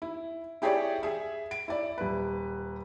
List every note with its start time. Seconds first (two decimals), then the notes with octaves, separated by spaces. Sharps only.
0.02 E4
0.62 E4 G4 G#4 C#5 D5
1.03 G#4 E5
1.51 D7
1.68 E4 D5
1.98 D#1 B4